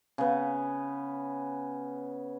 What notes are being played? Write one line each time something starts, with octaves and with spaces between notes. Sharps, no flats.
C#3 B3